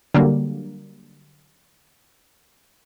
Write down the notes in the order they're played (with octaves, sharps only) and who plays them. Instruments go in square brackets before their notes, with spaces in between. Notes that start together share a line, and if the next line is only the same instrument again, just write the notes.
[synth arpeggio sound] D3 F#3 G3 A#3